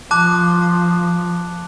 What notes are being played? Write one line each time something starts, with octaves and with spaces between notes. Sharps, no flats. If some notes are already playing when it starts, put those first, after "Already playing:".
F3 A5 D6 F#6